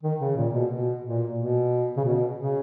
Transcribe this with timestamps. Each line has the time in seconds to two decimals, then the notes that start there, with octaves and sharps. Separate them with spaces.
0.03 D#3
0.20 C#3
0.37 A#2
0.53 B2
0.71 B2
1.05 A#2
1.38 B2
1.97 C#3
2.05 B2
2.38 C#3